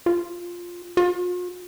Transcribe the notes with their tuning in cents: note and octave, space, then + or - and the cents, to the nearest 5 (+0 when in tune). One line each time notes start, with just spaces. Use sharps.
F4 +5
F4 +45